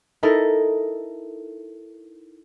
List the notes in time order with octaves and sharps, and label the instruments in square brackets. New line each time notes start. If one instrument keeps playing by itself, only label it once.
[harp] D#4 E4 A4 A#4